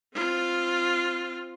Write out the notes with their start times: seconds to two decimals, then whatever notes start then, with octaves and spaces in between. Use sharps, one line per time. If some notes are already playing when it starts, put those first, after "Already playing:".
0.15 C4 F4